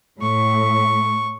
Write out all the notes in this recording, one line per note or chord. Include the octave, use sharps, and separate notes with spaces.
A2 C#6